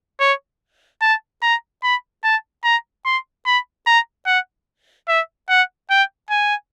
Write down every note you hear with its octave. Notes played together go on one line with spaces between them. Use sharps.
C#5
A5
A#5
B5
A5
A#5
C6
B5
A#5
F#5
E5
F#5
G5
G#5